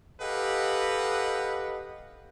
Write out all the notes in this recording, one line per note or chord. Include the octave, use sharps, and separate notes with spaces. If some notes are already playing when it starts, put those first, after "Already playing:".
G4 A4 B4 D#5 F5 F#5